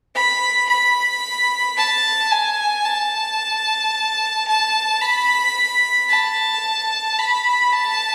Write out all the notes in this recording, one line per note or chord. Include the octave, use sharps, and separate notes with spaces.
B5
B5
A5
G#5
A5
A5
B5
A5
B5
A5